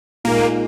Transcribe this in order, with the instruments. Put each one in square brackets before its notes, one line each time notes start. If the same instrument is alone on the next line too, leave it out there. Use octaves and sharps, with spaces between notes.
[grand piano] A#2 G#3 D#4 [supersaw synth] A#3